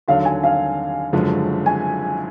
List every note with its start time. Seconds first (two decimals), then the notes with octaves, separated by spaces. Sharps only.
0.08 D#2 D3 F#3 F5
0.25 G#5
0.43 F5
1.13 F#1 F#2 D3 F3 G#3
1.66 G#5